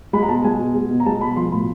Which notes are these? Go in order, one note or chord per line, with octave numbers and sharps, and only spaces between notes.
G#3 B5
A#5
B2 A5
G#3 G#5
B2
G#3
B2
A#5
G#3 A5
B2 B5
F3 C6
A2 B5